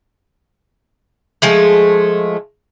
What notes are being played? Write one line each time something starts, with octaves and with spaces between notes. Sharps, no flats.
F3 G#3 A3